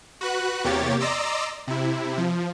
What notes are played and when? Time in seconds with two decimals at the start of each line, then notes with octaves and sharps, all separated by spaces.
0.21 F#4 B4 F#6
0.64 E2 C3 A#3 G4 C#5 A6
1.00 D5 D#5 A#5 C6 D6 E6
1.67 C3 E4
2.18 F3